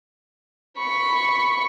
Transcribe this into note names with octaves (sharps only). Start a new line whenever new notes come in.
B5 C#6